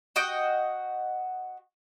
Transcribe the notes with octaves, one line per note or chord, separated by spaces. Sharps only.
F#4 D#5 G5